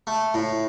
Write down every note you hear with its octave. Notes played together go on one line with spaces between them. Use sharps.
A3
A2